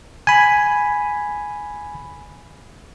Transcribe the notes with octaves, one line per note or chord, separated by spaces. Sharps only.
G#5 B5